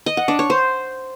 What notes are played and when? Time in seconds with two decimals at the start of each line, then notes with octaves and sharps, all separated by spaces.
0.06 D#5
0.17 F#5
0.28 D4
0.39 C#5
0.50 C5